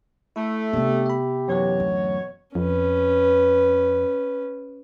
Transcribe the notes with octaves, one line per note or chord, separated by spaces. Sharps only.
A3 E4
C3 B3 D4 G4
E5 B5
F#2 B2 E3 F#3 F#4 C#5
D2
F2 C#4 B4